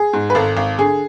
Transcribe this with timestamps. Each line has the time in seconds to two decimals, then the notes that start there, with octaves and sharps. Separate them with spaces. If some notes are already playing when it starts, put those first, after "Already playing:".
Already playing: G#4
0.13 G#2
0.30 B4
0.35 G#1 A4
0.57 G#1
0.79 D3 G#4